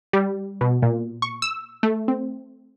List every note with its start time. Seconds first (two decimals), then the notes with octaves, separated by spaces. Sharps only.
0.13 G3
0.61 B2
0.82 A#2
1.22 C#6
1.42 E6
1.83 A3
2.08 C4